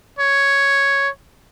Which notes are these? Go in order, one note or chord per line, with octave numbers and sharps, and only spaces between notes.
C#5